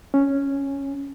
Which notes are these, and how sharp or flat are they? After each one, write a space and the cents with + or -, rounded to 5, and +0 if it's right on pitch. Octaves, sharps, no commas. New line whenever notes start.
C#4 +0